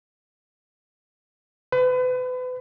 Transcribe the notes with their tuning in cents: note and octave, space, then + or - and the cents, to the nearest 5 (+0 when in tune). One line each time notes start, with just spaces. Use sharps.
B4 +35